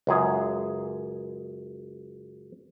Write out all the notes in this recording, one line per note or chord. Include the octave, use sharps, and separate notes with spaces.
C#2 F#2 G#4